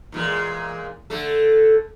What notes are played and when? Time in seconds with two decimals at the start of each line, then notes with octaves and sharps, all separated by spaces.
0.12 E2 A#2 G#3
1.10 D3 A3 A4